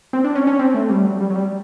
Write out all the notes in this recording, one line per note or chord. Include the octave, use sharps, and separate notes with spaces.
C4
D4
C#4
C#4
C4
A3
G3
F#3
G3
F#3
G3